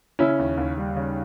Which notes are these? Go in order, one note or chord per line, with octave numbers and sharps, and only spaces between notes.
C#3 C#4 E4
D#2
D#2
G3
C#3